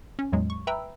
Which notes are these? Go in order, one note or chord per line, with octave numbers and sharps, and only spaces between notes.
C#4
E2 A2 F#3 G#3
C#6
B4 E5 G5 A#5 B5 E6